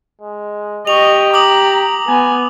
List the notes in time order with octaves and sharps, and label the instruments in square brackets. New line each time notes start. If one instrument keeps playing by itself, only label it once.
[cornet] G#3
[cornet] G4 [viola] D#5 C#6 [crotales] F7
[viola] A#5 [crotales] D6 D#6 F#7
[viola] B3 [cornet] G#5